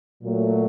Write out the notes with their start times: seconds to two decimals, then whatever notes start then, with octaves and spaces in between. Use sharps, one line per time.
0.22 A#2 F#3 A3